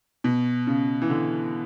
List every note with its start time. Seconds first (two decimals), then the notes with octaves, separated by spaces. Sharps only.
0.24 B2
0.67 C#3
1.02 E3
1.10 D3